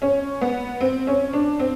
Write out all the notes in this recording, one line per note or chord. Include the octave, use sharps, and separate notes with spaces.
C#4
B3
C4
C#4
D4
C4